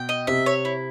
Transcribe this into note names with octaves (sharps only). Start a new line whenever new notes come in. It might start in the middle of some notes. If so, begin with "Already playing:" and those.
Already playing: B2 G5
D#5
C3 C4 E5
C#5
E4